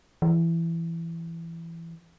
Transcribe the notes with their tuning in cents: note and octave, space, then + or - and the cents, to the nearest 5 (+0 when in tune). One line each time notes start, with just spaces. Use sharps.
E3 +15